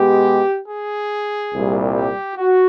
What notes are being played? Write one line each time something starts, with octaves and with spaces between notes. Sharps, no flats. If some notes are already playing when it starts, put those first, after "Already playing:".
Already playing: B2 G#3 B3 G4
G#4
C2 A#2 G3
G4
F#4